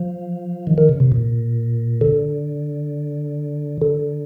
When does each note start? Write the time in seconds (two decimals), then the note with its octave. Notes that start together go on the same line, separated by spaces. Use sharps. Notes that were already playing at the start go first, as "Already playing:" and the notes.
Already playing: F3
0.67 D#3
0.78 D#3
0.89 C#3
1.00 C3
1.12 A#2
2.01 D3
3.82 D3